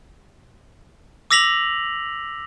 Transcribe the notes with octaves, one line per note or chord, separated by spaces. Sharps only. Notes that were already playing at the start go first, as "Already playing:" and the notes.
D6 E6 A#6 B6 F7 F#7